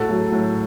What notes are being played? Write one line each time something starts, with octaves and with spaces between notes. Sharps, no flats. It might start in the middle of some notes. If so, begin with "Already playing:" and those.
Already playing: A2 F#4 A4
F#3 A3
A2